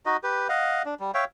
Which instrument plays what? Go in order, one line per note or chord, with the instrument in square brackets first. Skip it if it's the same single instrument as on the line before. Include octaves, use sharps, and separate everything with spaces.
[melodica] D#4 F#4 D#5
G4 B4
D#5 F5 F#5
D4
G3
C#5 E5 F5 G5